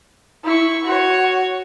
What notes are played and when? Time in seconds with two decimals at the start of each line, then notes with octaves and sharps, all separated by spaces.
0.44 E4 C#6
0.84 F#4 C#5